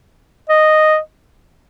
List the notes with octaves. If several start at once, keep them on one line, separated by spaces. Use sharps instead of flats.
D#5